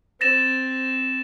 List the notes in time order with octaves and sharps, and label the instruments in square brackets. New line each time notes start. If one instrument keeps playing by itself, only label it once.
[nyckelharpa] C4 [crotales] A6 A#6 E7